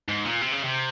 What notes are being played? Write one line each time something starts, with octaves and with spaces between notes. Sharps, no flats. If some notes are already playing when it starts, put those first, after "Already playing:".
G#2
A#2
C3
C#3
C3